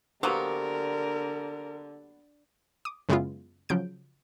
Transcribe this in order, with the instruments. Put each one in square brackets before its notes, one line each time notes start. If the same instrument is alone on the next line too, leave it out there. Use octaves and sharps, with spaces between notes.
[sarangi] D3 [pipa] F#3 A#3 B3 [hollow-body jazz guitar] G4 C5 [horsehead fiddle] A#4
[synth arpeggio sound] D6 D#6
F#2 C#3 G#3 B3 E4 F4
C#3 F3 F#3 G6 D7